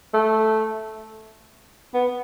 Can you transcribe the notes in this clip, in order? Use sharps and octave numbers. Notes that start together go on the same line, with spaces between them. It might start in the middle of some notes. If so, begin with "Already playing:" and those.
A3
B3